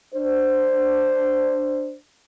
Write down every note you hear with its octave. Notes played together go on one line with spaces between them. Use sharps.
D4 C5